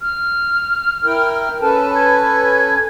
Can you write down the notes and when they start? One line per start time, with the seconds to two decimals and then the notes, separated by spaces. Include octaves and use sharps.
0.01 F6
1.04 E4 A#4 G5
1.41 F6
1.61 C#4 A4 B4 A5
1.95 G#6